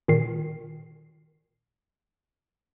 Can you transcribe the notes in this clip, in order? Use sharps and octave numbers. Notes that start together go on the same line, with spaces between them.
A#2 D#3 C7